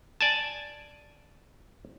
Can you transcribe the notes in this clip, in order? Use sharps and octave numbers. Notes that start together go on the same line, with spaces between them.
D5 G#5 A5